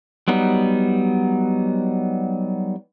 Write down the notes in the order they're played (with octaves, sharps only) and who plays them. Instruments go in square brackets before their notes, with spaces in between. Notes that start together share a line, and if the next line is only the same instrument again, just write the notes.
[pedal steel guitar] F#3 G3 B3 D#4